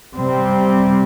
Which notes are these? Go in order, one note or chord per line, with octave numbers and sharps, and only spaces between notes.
C3 G3 C4